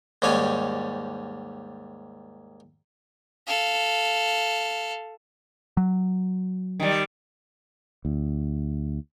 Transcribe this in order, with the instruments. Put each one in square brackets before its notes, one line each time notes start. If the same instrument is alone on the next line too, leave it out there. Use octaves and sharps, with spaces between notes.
[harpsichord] D#2 G#2 G3 C#4 G#5
[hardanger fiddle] A4 F5
[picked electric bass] F#3
[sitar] D#3 G3
[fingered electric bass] D2